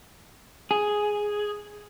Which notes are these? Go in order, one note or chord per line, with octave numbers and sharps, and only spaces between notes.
G#4